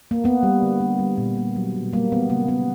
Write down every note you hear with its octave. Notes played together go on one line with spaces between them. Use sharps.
A#3
A#3 B3
G3
D3
A#3
G3
A#2
A#3
F#3
B2
G3 A#3
E3 B3
C#3 A#3
A#3 B3